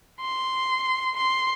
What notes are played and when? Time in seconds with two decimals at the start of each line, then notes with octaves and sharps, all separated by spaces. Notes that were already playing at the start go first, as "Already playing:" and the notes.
0.20 C6
1.16 C6